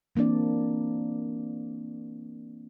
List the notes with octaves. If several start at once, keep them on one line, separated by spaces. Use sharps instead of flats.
E3 A#3 C4 D4 D5